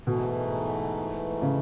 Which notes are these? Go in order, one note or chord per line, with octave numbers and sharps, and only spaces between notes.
G#2 B2 E3 A3
C#3